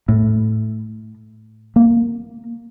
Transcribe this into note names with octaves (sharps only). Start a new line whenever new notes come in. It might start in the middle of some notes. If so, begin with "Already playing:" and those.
A2
A#3